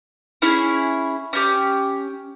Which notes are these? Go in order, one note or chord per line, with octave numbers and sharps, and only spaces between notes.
C#4 E4 G#4
C#4 E4 G4